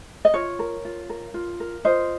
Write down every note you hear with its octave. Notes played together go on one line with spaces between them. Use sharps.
D#5
F4 C#5
A#4
F4
A#4
F4
A#4
F4 C5 D#5